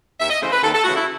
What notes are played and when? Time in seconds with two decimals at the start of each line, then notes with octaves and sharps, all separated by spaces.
0.20 D#2 E5
0.30 D#5
0.41 C#3 E3 A3 C5
0.52 B4
0.63 D#2 A4
0.74 A4
0.84 C#3 E3 A3 F#4
0.96 E4